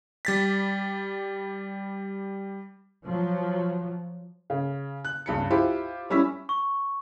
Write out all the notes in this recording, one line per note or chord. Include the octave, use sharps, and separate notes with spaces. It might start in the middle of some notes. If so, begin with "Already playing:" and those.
G3 A6 B6
F3 F#3
C#3
F#6
C#2 G2 B5 C#7
E4 F4 G4 C5 E5 B5
G3 C#4 E4 E6 B6
C#6